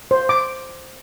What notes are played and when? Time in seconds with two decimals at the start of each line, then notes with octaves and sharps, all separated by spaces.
0.11 C5
0.29 D6